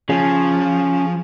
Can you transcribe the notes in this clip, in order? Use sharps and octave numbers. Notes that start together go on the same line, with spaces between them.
F3 C#4 G#4